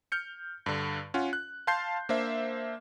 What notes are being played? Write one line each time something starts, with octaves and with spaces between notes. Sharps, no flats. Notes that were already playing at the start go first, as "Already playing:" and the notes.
F6 G6 C#7
G2 D3
C#4 F4 F#5
F#6
F5 A5 C6 G6 C7
A#3 D4 C5 E5